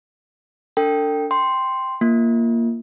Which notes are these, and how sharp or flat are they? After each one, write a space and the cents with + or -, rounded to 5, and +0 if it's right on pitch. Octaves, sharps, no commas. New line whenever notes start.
D4 -25 A4 +40 G5 +0
G5 +0 C6 +0
A#3 +0 F4 -15